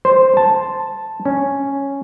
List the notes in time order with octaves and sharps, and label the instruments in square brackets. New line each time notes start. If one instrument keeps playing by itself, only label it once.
[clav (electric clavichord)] C5
A5
C#4